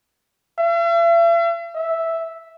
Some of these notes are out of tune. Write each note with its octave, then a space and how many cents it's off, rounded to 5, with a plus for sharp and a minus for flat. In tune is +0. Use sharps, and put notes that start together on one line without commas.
E5 +45
E5 -5